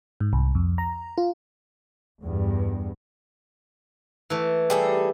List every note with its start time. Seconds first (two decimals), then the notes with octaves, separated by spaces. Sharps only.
0.21 G#2
0.33 C2
0.55 F2
0.78 A#5
1.18 F4
2.23 E2 G2
4.30 E3 A3
4.70 G3 G#4 A4